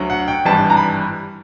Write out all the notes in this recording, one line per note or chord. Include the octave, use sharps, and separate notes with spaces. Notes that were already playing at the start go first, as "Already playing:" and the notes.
Already playing: D2 D3 F#3
F#5
G5
G#1 G2 E3 G3 A5
A#5
B5